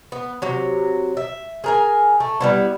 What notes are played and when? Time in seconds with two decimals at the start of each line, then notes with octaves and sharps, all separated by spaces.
0.12 B3
0.42 C3 F#3
1.17 E5
1.64 G#4 A#4 G#5
2.20 A3
2.41 G3 B3 E4